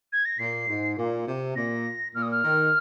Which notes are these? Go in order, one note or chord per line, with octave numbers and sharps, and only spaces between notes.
G#6
A#6
A#2 C7
G#2
A#2
C3
A#2 A#6
A#2 F6
D#6
F6
D#3